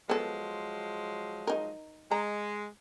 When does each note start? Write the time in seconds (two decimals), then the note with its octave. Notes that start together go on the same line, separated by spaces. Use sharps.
0.10 F3 F#3 G#3 B3 A4
1.47 D#4 A#4
2.11 G#3 A#5